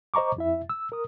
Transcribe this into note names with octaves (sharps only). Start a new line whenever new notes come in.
C5 D#5 A#5 C#6 D6
F2 E4 E5
E6
A#4 D#6